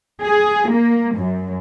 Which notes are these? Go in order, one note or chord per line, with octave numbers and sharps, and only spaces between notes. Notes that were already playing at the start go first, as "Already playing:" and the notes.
G#4
A#3
F#2